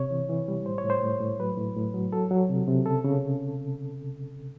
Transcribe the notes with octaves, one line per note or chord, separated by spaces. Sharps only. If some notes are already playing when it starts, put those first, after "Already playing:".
Already playing: C3 C#5
E3
E3
G3
A2 C5
C#5
A2
C5
A2
A2
F#3 B4
A2
A2
F#3
F#3 A4
F#3
C3
C3
C#3 A4
C#3